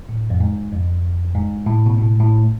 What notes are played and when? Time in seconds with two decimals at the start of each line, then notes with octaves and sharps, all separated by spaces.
0.09 A2
0.30 F2
0.40 G#2
0.72 F2
1.35 G#2
1.66 A2
1.86 B2
1.98 A2
2.20 A2